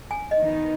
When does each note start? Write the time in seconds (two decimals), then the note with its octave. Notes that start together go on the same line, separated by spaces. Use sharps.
0.11 G#5
0.31 D#5
0.41 D#3 B3 D#4